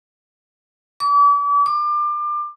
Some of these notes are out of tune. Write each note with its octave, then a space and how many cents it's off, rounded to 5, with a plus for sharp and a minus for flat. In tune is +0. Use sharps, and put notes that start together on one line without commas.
D6 -40
D6 +30